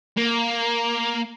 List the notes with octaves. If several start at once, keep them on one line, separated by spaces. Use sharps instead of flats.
A#3